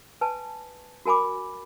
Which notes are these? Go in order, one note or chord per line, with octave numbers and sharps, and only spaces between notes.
B4 G#5 A5
F#4 A#4 G#5 B5 D6